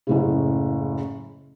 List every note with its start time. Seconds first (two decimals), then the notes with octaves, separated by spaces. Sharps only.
0.07 F#1 A2 C#3